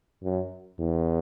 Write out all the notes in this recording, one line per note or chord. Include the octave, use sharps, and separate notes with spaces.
F#2
E2